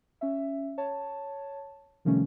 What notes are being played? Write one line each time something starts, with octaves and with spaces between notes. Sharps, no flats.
C#4 E5
C#5 A5
C3 D#3 F3 G3 A3 C#4